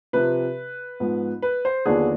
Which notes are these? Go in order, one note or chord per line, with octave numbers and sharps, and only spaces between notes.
C3 F3 C4 B4
G#2 F3 B3
B4
C5
D#2 D3 F3 B3 D4 G#4